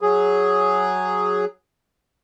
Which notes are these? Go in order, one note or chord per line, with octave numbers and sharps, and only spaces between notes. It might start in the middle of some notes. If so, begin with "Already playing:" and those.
F#3 G#4